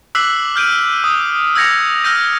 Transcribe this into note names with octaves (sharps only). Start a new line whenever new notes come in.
D6 E6 F#6 B6 C7 F#7
F6 G6 D7 D#7
D#6
E6 G6 G#6 A#6 C#7 F7
E6 F6 G6 A#6 D#7